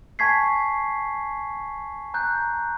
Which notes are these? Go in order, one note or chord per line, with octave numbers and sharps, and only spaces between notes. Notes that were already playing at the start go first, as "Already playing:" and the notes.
G#5 A5 C#6 G#6 B6 C7
A#5 F#6 G6